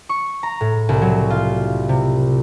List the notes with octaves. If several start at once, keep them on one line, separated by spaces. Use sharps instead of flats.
C#6
A#5
A2
C2
F#3
F4
C3